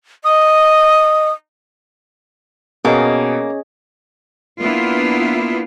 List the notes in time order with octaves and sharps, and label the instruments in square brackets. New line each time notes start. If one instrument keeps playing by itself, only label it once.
[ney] D#5 [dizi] D#6
[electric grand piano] B2 [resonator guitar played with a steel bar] A#3 [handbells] C#4 C#5 [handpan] G#4 D#5
[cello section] A#3 B3 D4 E4 F4